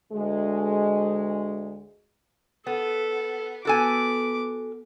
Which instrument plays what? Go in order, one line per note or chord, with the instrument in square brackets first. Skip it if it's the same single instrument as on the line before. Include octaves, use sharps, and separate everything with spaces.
[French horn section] D2 G#3
[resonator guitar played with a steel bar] B3 [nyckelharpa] A4
[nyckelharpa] B3 D6 [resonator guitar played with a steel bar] F#4 A4 G#5